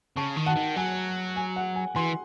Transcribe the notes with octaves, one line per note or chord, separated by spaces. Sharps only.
C#3 A5 C#6
D#3
F#5 A5
D#3
F#3 G#5
G#5
F#5
G#5
E3 G#5 C6